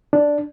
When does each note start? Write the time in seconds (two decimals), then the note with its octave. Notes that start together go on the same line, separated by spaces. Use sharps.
0.13 D4